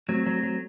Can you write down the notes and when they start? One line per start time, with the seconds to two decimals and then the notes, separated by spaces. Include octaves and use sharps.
0.08 F#3 A3 C4
0.27 F#3
0.43 F#3